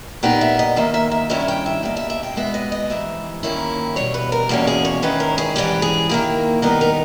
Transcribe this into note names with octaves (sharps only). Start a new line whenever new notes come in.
A#2 G3 B3 D#4 G5
E5
D#5
D#2 D#3 A#3 E5
E5
E5
G2 D#3 G3 C#4 E4 E5
E5
G5
E5
B2 G3 A#3 E5
E5
E5
G5
B2 G#3 B3 E5
D#5
D#5
G#2 E3 G3 E5
D#2 D#3 A#3 C#4 E4
E2 B2 G3 C#5
B4
A#4
E2 B2 A#3 C#4 G4
G#4
C#5
E2 D#3 G#3 C#4 E4 B4
A#4
G#4
G#2 E3 G3 C#4 G4
G#4
D#3 A#3 E4 G4
D#3 G3 B3 D#4 A#4
A#4